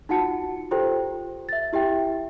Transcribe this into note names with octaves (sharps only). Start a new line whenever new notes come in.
D#4 F4 F#4 F#5 A5 C#7
F4 G4 A4 C5 G5
E5 A6
E4 G4 E5 G5